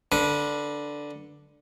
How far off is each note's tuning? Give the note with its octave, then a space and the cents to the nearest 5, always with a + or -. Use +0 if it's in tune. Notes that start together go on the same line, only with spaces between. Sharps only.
D3 +0 B4 -25